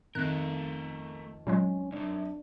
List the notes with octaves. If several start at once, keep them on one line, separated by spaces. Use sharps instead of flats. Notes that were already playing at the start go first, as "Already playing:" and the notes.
F2 D#3 A3 A#4 F#6
A#2 F#3 G#3 C#4
C2 F#2 D4